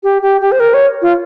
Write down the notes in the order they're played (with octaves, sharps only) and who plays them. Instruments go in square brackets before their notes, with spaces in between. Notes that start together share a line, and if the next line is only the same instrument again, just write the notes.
[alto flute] G4
G4
G4
C5
A#4
C#5
F4